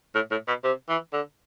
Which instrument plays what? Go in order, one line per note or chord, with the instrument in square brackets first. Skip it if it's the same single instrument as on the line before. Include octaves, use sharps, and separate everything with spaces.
[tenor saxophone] A2
A2
B2
C3
E3
D3